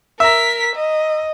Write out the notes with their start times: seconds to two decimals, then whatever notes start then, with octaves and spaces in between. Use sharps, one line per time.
0.20 A#4 E5 A#5 B6
0.76 D#5